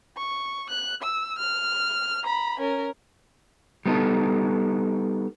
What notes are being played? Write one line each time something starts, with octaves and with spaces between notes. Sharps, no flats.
C#6
F#6
E6
F6
A#5 B5
C#4 A#4
G3 B3 D#4 A4